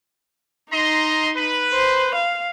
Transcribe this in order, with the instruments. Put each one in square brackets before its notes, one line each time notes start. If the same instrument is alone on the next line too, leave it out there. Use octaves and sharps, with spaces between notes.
[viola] D#4 [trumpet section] D#5 A#5 C6
[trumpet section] B4
[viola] C5
F5